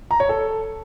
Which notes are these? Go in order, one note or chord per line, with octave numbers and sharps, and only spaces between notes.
A#5
C#5
A4